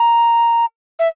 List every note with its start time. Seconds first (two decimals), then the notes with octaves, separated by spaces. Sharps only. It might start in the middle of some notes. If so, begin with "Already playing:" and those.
Already playing: A#5
0.99 E5